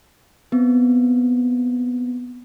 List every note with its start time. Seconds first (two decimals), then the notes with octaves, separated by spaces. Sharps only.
0.52 B3 C4